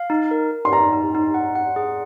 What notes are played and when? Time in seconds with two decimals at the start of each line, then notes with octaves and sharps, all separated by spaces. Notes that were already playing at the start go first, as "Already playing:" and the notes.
Already playing: F5
0.10 D#4
0.31 A#4
0.51 A#4
0.65 C6
0.72 D#4 A#5
0.93 D#4
1.15 D#4
1.34 F#5
1.55 F#5
1.76 G#4